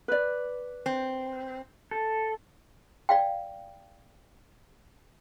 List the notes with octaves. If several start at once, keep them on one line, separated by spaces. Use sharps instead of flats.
B4 D5
C4
A4
D5 F5 G5